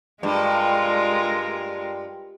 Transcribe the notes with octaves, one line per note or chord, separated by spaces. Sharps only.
G2 G#3 F4 A#4